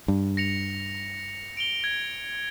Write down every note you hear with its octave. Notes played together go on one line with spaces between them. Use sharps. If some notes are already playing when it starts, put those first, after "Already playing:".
G2
A#6 C#7 F7
D7 F7 G7
G#6